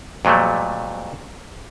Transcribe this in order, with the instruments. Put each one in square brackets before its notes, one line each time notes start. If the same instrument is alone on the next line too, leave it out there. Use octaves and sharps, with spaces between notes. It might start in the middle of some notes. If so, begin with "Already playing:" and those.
[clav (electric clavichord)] F2 A#2 F#3 G3 A3